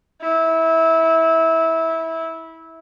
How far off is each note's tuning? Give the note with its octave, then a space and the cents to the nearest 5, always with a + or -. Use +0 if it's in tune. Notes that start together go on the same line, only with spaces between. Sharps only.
E4 -20